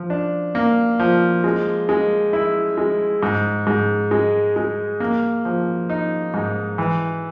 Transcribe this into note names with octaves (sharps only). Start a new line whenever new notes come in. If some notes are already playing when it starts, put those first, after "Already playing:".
Already playing: F3
D4
A#3
F3
G#3
G#3
E4
G#3
G#2
G#2
G#3
G#3
A#3
F3
D#4
G#2
E3